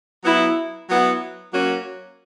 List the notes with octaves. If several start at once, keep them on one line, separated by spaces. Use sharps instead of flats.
F#3 B3 E4
F#3 B3 E4
F#3 A#3 C#4 F#4